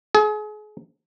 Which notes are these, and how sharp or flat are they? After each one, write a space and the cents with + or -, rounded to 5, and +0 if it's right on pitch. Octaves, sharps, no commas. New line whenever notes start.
G#4 +35